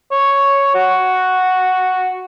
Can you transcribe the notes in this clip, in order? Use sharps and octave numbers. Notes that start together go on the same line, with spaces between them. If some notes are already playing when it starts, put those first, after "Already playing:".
C#5
F#4